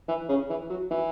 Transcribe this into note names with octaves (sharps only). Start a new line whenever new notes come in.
E3
C#3
E3
F#3
E3